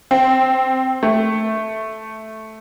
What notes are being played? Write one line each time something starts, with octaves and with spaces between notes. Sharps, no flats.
C4
A3